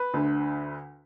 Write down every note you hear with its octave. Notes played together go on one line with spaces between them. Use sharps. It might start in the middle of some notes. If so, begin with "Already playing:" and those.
Already playing: B4
D2 D3